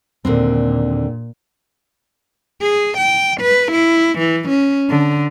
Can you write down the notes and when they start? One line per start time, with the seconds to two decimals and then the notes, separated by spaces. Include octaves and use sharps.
0.25 D#2 A#2 D3 C4
2.62 G#4
2.98 G5
3.41 B4
3.72 E4
4.19 E3
4.49 C#4
4.90 D3